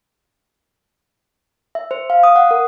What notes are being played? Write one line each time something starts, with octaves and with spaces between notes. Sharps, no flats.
E5
C5
F5
D#6
F#5
A#4